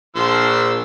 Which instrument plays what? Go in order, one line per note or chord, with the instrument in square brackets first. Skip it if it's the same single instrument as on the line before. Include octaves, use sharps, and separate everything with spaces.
[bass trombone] A#1 [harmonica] F3 C6 E6